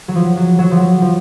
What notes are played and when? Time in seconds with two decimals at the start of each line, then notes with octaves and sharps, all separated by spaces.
0.08 F#3
0.15 F3
0.37 F#3
0.59 F#3
0.71 F3
0.80 F#3
1.02 F3